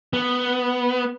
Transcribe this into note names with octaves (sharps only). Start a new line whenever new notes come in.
B3